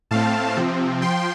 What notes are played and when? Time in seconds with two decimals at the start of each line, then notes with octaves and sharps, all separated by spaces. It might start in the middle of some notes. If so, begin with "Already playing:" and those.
0.11 A2 A3 C4 F5 A5
0.56 C3 F3 C4
1.02 F3 G5 C6